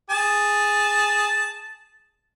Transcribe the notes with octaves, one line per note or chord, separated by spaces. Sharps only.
G#4 A5